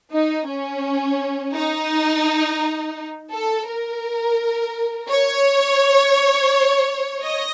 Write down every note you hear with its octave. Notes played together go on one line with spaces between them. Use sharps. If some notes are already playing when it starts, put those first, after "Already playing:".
D#4
C#4
D#4
A4
A#4
C#5
D#5